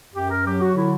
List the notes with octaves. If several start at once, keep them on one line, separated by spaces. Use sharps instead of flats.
F#2 G4
A#4
F#3 G4
F#4
D3 E4